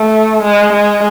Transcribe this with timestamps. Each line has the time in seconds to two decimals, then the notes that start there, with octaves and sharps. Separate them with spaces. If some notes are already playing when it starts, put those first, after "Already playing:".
Already playing: A3
0.43 G#3
0.73 G#3